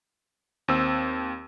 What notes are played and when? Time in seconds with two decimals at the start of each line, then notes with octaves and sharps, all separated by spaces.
0.68 D#2 C4 E6